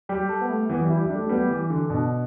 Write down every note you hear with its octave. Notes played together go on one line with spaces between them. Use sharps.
G3 G4
A4
B3
A3
E3 B3
E3
G3 E4
G3
D4
A3
G3 B3
E3
D3
B2 D4